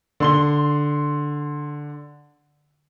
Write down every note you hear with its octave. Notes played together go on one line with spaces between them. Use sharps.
D3 C6 G7